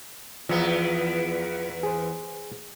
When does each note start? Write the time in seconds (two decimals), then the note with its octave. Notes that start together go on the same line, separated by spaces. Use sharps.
0.49 E2 F3 B3
1.83 G#4 C5